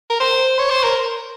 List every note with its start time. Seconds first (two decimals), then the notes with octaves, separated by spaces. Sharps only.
0.10 A#4
0.20 C5
0.58 C#5
0.70 C5
0.84 A#4